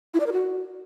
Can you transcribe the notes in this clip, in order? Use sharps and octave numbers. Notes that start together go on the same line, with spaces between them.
E4
D5
A#4
F#4